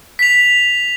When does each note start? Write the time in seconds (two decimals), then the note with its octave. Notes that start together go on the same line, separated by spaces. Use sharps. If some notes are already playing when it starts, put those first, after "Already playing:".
0.19 B6 F7